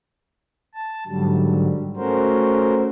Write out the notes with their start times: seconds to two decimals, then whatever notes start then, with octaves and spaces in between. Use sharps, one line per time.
0.74 A5
1.07 G#2 D3 F#3 G3
1.96 A3 C#4 F#4 A#4 C5